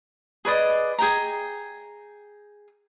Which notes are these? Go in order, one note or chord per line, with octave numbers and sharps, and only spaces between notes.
G#4 B4 D5 D#5
G#4 G5 A#5